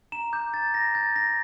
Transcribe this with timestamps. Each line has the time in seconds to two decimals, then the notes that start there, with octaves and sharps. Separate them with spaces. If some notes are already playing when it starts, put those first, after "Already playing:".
0.12 A#5 E7
0.33 D6 G6
0.53 A#5 A6
0.74 A#5 A#6
0.95 G6 A6
1.15 G6 A#6